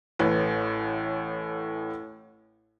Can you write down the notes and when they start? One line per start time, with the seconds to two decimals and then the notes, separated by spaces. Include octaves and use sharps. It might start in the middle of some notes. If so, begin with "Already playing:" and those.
0.19 A1 A2 B4